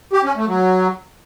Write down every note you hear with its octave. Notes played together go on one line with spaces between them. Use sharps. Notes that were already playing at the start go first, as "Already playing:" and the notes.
G4
C#4
A3
F#3